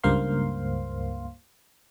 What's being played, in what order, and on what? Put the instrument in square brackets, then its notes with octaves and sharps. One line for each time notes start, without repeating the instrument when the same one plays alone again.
[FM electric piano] C#2 G2 A#3 C5 F5 C6